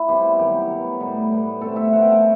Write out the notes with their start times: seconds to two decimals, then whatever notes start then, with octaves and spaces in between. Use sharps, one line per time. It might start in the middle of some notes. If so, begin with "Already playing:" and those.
Already playing: E4
0.09 B2 G3 C4 G4
0.39 D#3 F#3 B3 G4
0.70 D#3 F#3 B3
1.00 A2 G3 B3
1.31 A2 G3 B3
1.61 B2 A3 C4 A4
1.76 E5
1.93 B2 A3 C4 F#5
2.02 G5
2.12 A5